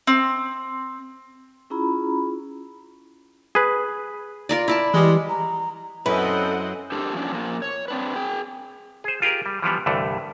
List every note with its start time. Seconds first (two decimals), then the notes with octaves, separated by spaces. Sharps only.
0.07 C4
1.70 C#4 E4 F4 G#4 A#5 B5
3.55 G#4 B4
4.49 F4 A#4 D5
4.68 E4 D5 A5
4.94 E3 G3 G#3
5.30 A#5
6.06 F#2 C4 C#4 E4 A4 B4 D#5 F#5
6.92 D4 G4 A4 A#4 C5
7.15 F3 F#3 A#3 C#4 D4
7.32 F3 A#3
7.62 C#5
7.88 C4 D4 B4
8.16 G#4 G5
9.04 G#4 C5
9.22 F4 G4 G#4 A#4
9.46 G3
9.62 E3 F3 G3 B3
9.86 C2 G2 D3 E3 A3